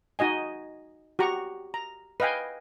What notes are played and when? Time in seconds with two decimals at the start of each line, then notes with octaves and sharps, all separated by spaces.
0.19 D#4 F#4 D#5 G#5
1.19 F#4 G4 A#5 C#6
1.74 A#5
2.20 B4 D#5 F5 G5 G#5